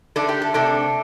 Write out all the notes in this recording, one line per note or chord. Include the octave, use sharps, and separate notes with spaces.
D3 A3 D4 A4
G4
A4
C3 A3 D4 A4